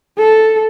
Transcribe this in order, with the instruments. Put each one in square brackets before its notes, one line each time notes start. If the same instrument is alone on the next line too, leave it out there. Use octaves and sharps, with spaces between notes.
[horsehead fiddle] A4